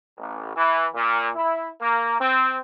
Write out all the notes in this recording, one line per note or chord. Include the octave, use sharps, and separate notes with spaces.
A1
E3
A#2
E4
A#3
C4